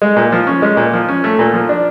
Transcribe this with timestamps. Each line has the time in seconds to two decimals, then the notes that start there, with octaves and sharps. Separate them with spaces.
0.02 G#3
0.16 A#2
0.32 F3
0.47 C#4
0.62 G#3
0.77 A#2
0.93 F3
1.08 C#4
1.24 A3
1.39 A#2
1.53 F3
1.69 D4